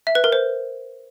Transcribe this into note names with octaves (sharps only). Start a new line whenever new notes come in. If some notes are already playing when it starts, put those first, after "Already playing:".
E5
B4
A#4
C5